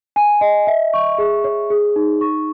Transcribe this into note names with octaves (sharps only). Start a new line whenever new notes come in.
G#5
D#5
E5
C#6
G#4
C#5
G#4
D#4
C#6